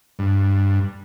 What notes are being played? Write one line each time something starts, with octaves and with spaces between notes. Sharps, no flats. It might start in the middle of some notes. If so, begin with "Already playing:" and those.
G2